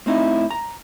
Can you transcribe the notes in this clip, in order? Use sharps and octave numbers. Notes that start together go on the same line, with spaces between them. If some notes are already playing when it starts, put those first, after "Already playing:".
A2 C4 D#4 E4
A#5